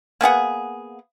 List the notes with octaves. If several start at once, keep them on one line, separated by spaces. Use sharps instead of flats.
A#3 B3 G#4 F#5